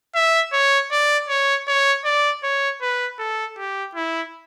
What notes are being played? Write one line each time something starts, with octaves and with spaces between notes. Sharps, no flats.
E5
C#5
D5
C#5
C#5
D5
C#5
B4
A4
G4
E4